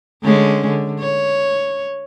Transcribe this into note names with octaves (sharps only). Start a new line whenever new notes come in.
D3 G#3 C#4
D3
C#5